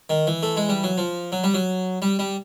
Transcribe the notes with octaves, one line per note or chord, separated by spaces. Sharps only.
D#3
E3
A3
G#3
G3
F#3
F3
F#3
G3
F#3
G3
G3